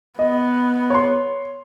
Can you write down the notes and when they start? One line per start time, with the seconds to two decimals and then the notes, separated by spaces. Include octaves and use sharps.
0.19 B3 D#5
0.90 C#5 C6